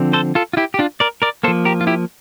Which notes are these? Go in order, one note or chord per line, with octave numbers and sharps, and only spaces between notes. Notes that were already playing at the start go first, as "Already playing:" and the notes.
Already playing: D3 F3 C4
A4 C5
F4 A4
F4
E4 G4
G4
D4 F4
A#4 D5
A#4 D5
F3 A#3 A4 C5
G4 A#4
F4
E4 G4